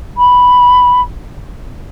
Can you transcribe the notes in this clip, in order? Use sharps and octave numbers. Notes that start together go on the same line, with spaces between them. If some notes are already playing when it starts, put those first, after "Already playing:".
B5